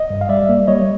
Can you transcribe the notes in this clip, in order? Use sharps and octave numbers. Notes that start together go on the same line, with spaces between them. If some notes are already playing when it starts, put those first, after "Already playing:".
Already playing: D#5
G2
F5
G3 D5 E5
A#3
G3 C#5 D#5